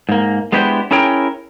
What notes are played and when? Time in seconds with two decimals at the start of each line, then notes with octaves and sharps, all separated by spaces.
0.09 G#2 A#3
0.52 G#3 B3 D4 E4 G4 C5
0.91 C#4 E4 G#4 A#4 C#5 G5